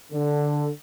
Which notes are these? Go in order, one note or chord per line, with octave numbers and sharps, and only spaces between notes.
D3